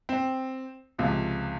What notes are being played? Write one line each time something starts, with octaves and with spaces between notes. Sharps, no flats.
C4
C#2 C3 F3